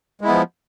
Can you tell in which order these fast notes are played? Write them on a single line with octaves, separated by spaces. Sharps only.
G#3 E4 B3 F3